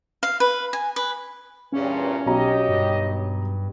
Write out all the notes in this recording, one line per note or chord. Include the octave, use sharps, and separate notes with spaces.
F5
B4
G#5
B4
E2 G2 A#2 C#4
B1 G4 C#5 D#5 A#5
G2